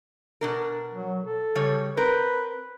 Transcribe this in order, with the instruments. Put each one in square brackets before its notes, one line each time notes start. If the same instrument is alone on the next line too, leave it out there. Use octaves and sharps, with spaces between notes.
[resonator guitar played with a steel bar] B2 D4 A#4
[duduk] F#3
A4
[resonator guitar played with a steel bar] C#3 G3 C#5
[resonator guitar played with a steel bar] C4 A#4 [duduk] B4